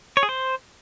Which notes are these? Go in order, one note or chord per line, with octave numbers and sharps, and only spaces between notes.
C#5
G#4
C5